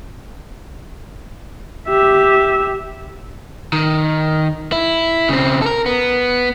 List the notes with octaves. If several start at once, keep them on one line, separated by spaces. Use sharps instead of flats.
G4 E5
D#3
E4
C#3 C4
A4 A#4
B3